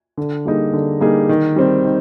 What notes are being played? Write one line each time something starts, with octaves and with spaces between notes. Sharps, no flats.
D3
G3 A#3 D#4 G#4
D3
G3 A#3 D#4 G#4
D#3
G3 C4
D#3